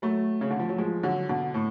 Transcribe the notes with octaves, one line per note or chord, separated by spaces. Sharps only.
F#3 A3
C#3
D3
F3
F#3
F3 G#3
D3 F#3
B2 D3
A2